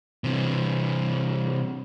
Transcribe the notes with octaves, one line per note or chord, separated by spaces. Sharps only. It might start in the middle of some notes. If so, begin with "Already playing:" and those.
C3 E3